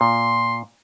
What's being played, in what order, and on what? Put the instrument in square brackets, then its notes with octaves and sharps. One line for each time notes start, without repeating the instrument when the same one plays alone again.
[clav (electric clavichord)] A#2 [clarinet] C6